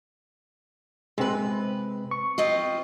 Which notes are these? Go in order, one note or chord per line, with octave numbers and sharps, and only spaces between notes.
C3 G#3 C4 B4
C#6
C4 F4 D#5